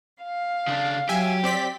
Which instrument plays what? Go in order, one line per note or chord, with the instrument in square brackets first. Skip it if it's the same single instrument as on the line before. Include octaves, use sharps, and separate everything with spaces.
[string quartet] F5
[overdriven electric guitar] C#3 D4
[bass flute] F#3 [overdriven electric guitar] G4 [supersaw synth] E5 G#5
[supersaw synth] C4 D5 B6